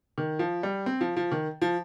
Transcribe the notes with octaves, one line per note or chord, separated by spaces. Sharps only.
D#3
F3
G3
C4
F3
F3
D#3
F3